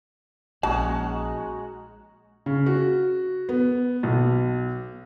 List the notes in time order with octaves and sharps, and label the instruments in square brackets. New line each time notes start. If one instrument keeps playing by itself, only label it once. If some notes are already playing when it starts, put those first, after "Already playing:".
[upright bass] A#1 [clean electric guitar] G#3 [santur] C#4 D#4 F#4 [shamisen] A5
[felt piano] C#3
F#4
B3
B1